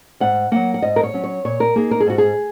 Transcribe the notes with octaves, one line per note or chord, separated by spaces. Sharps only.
G#2 F#5
F#3 A#3 F#5
F#5
G#2 D#5
A#4
C#5
F#3 C#4
C#5
A#2 C#5
A#4
A#3 D#4 G#4
A#4
G#4
G#2 F#4
G#4